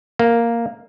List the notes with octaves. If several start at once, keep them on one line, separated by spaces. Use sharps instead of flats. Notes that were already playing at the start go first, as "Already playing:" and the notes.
A#3